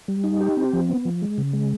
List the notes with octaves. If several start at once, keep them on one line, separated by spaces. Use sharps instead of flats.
G3
D#4
G4
C4
F3
B3
F3
G#3
C#3
G#3